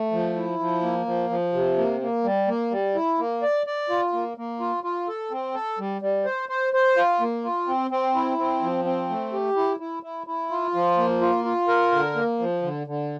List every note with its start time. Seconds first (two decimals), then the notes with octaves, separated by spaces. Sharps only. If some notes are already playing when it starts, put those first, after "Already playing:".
Already playing: A3
0.12 F3
0.36 E4
0.59 F3
0.82 A#3
1.06 F3
1.30 F3
1.53 C3
1.78 A#3
2.01 A#3
2.24 G3
2.47 A#3
2.71 G3
2.95 E4
3.18 A#3
3.42 D5
3.67 D5
3.90 F4
4.13 A#3
4.37 A#3
4.60 F4
4.84 F4
5.08 A4
5.31 C4
5.54 A4
5.79 G3
6.02 G3
6.25 C5
6.49 C5
6.73 C5
6.97 F4
7.20 A#3
7.44 F4
7.67 C4
7.91 C4
8.15 E4
8.38 C4
8.61 F3
8.85 C4
9.09 A3
9.33 G4
9.56 E4
9.80 E4
10.03 E4
10.27 E4
10.50 F4
10.75 F3
10.97 A#3
11.21 F4
11.45 F4
11.68 A#4
11.92 D3
12.15 A#3
12.39 F3
12.62 D3
12.87 D3